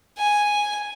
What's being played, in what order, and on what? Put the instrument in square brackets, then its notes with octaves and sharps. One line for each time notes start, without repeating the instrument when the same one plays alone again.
[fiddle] G#5